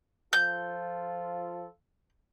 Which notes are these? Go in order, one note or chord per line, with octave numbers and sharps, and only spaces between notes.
F3 F4 A4 G6